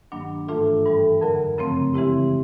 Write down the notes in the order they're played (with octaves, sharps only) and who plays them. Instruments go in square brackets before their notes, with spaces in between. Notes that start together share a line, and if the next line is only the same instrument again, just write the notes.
[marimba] G2 D#3 F#3 A#3 D4
[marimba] G#2 E3 A3 D4 F4 [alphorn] A4
[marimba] G2 E3 G3
[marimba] F2 D3 F#3 [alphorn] A#4
[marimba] F#2 C#3 F3 A3 C4
[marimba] C#3 E3 G#3 C4 E4 [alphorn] G4